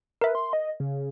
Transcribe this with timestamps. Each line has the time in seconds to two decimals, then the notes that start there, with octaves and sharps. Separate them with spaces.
0.21 A#4 B4 E5
0.35 C6
0.53 D#5
0.80 C#3